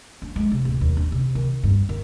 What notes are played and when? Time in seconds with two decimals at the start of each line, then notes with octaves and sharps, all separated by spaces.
0.22 D4
0.36 G#3
0.52 C3
0.65 D1
0.81 D#2
0.97 D4
1.12 C3
1.35 D#3
1.64 G2
1.89 D#3